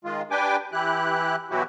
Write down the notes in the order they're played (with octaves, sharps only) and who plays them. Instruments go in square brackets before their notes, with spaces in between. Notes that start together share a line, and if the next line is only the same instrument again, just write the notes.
[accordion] D#3 G#3 F4
D4 G4 B4 G5 G#5 D6
E3 E4 G4 F#6
B2 E3 F#3 E4 F#4 G4